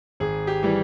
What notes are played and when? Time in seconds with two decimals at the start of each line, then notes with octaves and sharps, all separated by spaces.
0.20 G#1 G#4
0.47 G4
0.63 E3 G3